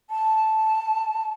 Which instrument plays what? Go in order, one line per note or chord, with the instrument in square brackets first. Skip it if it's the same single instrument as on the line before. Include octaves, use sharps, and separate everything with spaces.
[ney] A5